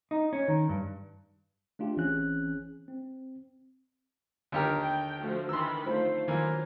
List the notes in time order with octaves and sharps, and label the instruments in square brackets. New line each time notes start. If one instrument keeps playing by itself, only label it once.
[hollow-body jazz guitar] D#4
C#4
D#3
G2
[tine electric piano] A3 D4 F4 G4
G#1 E3 C4 C#4 G#4 F#6
C4
[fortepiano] D#2 G4 A#4 [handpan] D3 B3 D4
[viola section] G5
F3 A3 F#4
[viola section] D#3 E3 B5 [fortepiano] C6 E6
[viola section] A3 [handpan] D#4 F4 C5
[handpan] D#3 F#3 [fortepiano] E3 A#3 [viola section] F4